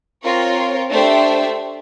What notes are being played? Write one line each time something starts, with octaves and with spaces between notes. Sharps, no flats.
C4 F4 A#4 C#5
A3 D4 G4 C5 E5